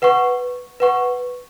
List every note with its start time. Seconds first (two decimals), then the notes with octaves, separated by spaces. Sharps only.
0.02 B4 F#5 C#6
0.80 B4 F#5 C#6